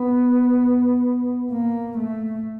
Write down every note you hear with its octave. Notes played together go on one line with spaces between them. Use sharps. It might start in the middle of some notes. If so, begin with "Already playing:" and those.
Already playing: B3
A#3
A3